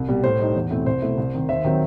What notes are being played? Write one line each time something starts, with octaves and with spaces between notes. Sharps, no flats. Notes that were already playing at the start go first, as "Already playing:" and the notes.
Already playing: C2
B2 G3
A2 C5
G3 D#4
E2
B2 A3 C4 E4
C2 C5
B2 A3 E4
C2
C3 D#3
D#2 C5 E5
D#3 F#3 C4